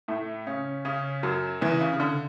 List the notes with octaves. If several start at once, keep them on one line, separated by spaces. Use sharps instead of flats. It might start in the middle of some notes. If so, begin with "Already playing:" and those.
A2 A3
C#3 C#4
C#3 C#4
F#2 F#3
E2 E3
C#3
C#3
D3